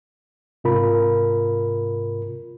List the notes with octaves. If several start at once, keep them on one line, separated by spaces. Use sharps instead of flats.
G#2 C3 F4 A#4 B5